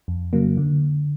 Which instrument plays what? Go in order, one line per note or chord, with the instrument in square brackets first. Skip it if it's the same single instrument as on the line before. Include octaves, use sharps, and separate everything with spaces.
[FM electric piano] F2
C#3 F#3 A#3
D3